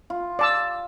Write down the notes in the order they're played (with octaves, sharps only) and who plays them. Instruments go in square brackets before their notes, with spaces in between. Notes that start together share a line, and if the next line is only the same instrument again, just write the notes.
[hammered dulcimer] F4
[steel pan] D5 A5 E6